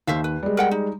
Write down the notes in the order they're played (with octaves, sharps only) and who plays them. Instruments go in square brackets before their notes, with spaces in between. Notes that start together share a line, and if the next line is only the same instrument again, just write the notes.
[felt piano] D#2 [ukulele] C5 E5 F5
[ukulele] B4
[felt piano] G3 G#3
[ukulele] A#4 F#5 G5
D#4